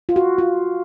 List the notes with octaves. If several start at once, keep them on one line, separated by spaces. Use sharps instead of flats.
F4
F#4
F4